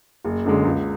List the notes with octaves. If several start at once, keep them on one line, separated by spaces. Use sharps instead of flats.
F#1
F#2 D3 G#3
C#2